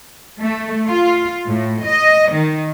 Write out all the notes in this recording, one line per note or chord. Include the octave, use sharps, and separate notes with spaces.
A3
F4
A2
D#5
D#3